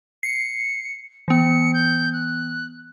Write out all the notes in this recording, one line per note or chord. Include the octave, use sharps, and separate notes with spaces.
C7 C#7
E3 B3 C#7
G6
F#6